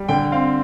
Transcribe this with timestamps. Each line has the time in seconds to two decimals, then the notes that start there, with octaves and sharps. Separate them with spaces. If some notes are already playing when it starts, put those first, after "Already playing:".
Already playing: G3
0.09 D3 G5
0.32 C4 F5